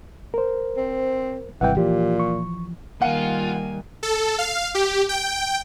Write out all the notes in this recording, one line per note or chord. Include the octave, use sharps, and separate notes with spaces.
A#4 C5
C4
G#1 C3 E3 G3 F#5 G5
A#2 E3 F3 G4
C#6
D#3 G3 A#3 F4 F#5 G#5 D#7
A4
F5
G4
G5